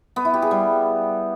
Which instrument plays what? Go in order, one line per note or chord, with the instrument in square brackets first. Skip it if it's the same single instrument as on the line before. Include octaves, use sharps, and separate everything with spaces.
[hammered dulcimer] B3
E4
G4
G#4
G3